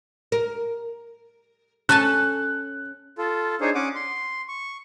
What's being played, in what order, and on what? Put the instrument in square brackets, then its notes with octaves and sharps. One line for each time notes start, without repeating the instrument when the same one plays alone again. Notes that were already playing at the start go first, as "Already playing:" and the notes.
[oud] A#4
[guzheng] C#4 G#5 A5 [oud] A4 [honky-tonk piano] F#6
[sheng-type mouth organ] F4 A4
D4 D#4 G#4 C5 C#5
C#4 F#5 D6 D#6
C6
C#6